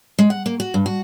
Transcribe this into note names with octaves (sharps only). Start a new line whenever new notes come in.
G#3
F#5
A#3
F#4
G2
F#4